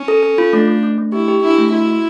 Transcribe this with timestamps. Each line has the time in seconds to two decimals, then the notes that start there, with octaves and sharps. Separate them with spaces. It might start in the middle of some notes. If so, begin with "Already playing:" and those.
Already playing: C#4
0.08 A4
0.23 A4
0.38 F4
0.53 A3 D4
0.68 A3
0.83 A3
0.98 A3
1.12 E4 G4
1.28 G4
1.43 D4 E4
1.58 A3
1.72 E4 F#4
1.88 F#4